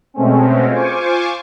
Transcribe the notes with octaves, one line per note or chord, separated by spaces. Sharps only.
B2 G#3 A3 C4 C#4
F4 C5 G#5 C#6 D6